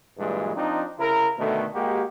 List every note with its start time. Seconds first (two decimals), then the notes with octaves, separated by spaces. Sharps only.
0.18 G2 A#2 E3 F#3 G#3
0.55 F3 C4 D4 D#4
0.99 C#3 E4 A#4
1.38 B2 D3 D#3 A3
1.73 G#3 A#3 F#4 G4